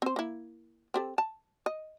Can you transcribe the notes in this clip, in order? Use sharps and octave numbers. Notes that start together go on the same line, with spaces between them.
C4 C5
A#3 E4
C4 G4 A4
A5
D#5